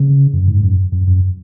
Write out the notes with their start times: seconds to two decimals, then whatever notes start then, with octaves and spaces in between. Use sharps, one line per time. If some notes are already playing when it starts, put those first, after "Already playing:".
Already playing: C#3
0.33 F#2
0.48 G#2
0.63 F#2
0.92 F#2
1.07 F#2